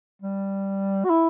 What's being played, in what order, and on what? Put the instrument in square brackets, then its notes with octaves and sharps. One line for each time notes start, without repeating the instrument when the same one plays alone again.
[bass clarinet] G3
F#4
E4